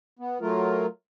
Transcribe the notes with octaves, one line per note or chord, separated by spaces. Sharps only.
B3
F#3 A3 F4 A#4